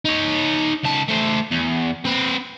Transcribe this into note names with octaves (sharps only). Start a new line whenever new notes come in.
D#4 C#5
C#2 A5
A3 C5
E2
C4 B4